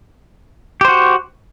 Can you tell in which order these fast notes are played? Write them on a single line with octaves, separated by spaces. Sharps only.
G4 C5 F#4